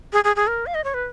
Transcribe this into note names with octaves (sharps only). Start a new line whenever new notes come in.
G#4
G#4
G#4
A#4
F5
D#5
C#5
B4